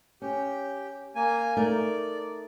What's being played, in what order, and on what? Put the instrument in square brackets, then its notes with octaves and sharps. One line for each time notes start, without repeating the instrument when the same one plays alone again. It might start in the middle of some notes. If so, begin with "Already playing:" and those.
[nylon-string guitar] C#4 [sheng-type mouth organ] G4
[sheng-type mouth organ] A#3 G#5
[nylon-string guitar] A3 D#4 A#4 [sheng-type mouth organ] D5